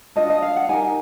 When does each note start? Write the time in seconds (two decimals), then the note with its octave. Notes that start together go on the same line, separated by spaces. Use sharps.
0.16 D4 F4 A4 D#5
0.30 D#5
0.42 F5
0.56 F#5
0.69 D#4 G4 A#4 G#5